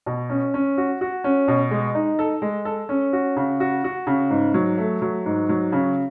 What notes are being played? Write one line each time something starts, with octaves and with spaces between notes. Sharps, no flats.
B2
C#4
C#4
F#4
F#4
C#4
B2
G#3
D#4
A4
G#3
A4
C#4
F#4
C#3
F#4
F#4
C#3
G#2
F#3
A3
F#3
G#2
F#3
C#3